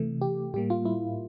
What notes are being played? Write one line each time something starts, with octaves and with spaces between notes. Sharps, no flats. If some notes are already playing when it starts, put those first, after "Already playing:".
Already playing: C3 E3 A3
G4
A2 G3 A#3 G4
F4
E4